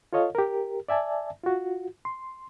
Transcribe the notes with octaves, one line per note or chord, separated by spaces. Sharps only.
F4 A4 C#5 D#5 F5
G4 A#4
D5 E5 G#5 A5
F4 F#4
C6